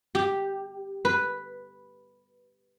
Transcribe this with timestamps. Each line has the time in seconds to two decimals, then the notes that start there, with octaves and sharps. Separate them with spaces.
0.15 G4
1.05 B4